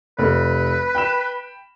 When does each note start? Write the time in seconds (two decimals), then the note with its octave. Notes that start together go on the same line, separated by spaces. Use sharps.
0.19 F1 B4
0.95 G5 B5 E7